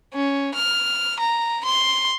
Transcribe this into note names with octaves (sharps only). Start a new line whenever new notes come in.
C#4
F6
A#5
C6